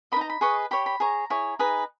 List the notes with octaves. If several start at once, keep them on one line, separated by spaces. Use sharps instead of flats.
D#4 A#4 D#5 A#5 B5
B5
G#4 B4 D#5 C#6
G4 C#5 B5
B5
G#4 C#5 A#5
E4 G#4 C#5
D#4 G#4 B4 D#5